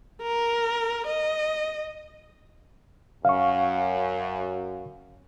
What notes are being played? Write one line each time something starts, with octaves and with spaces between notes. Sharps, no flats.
A#4
D#5
F#2 F5 C#6